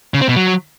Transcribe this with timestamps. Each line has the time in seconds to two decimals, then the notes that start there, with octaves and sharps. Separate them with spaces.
0.14 C#3
0.21 C4
0.29 B2
0.36 F#3